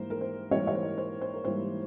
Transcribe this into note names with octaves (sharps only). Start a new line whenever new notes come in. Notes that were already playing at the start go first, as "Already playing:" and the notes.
Already playing: G#2 E3 G3 A#3 A#4 C5
A#4
C5
G#2 E3 G3 A#3 C#5
C#5
C5
C5
C5
A#4
G#2 E3 G3 A#3 C5